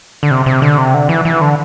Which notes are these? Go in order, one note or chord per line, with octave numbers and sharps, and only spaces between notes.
D3
C3
C3
D3
C3
D3
E3
E3
D3